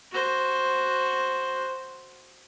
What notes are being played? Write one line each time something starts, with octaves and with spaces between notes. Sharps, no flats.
F#4 C5